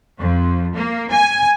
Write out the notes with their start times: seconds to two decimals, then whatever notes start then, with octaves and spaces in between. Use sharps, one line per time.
0.20 F2
0.75 A#3
1.12 G#5